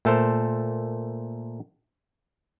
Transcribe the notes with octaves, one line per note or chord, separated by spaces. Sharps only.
A#2 A3 A4 A#4 C5